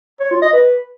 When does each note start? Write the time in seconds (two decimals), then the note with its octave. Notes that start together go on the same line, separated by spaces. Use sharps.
0.20 C#5
0.31 F4
0.42 D#5
0.53 B4